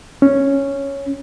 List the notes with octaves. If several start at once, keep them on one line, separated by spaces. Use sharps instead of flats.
C#4